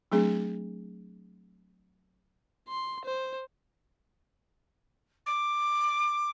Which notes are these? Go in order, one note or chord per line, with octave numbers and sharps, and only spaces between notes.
F#3 A3 C4 D4 G#4
C6
C5
D6